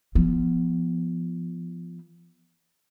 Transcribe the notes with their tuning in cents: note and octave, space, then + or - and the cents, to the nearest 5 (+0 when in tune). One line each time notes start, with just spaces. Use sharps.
F3 -25 B3 +0